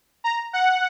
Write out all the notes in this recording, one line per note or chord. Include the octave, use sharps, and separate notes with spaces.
A#5
F#5